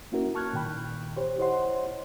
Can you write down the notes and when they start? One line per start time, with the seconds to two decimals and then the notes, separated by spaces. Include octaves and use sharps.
0.12 A#3 C#4 E4 F#4 A#4
0.35 A5 C#6 F6 F#6 G#6
0.53 A#2 D#3 G5 B5 F#6
1.17 G4 C5 C#5
1.39 E4 C5 C#5 D#5 F#5 C6